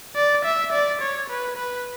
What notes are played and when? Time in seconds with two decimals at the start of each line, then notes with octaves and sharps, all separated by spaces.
0.15 D5
0.45 E5
0.72 D5
1.01 C#5
1.29 B4
1.56 B4